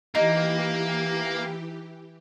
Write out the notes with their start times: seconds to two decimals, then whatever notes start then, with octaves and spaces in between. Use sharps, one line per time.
0.15 E3 A#3 D#4 G4